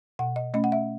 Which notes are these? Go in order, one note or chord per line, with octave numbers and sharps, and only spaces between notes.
B2 F#5
D#5
A3 C#4 D#5
F#5
E5